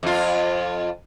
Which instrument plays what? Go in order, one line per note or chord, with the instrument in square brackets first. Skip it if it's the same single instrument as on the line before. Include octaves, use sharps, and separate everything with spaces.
[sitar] F2 F4